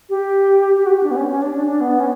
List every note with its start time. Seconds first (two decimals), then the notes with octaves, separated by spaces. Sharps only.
0.10 G4
0.78 G4
0.86 F#4
0.90 G4
1.04 D4
1.11 B3
1.16 C#4
1.29 C#4
1.42 D4
1.54 D4
1.68 D4
1.81 B3
2.00 C#4